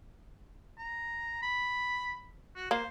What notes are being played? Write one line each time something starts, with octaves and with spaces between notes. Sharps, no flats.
A#5
B5
F#4
A#3 C5